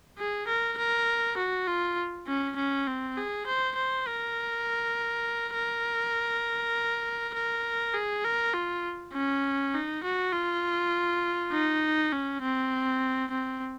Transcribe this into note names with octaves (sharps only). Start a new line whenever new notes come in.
G#4
A#4
A#4
F#4
F4
C#4
C#4
C4
G#4
C5
C5
A#4
A#4
A#4
G#4
A#4
F4
C#4
D#4
F#4
F4
D#4
C#4
C4
C4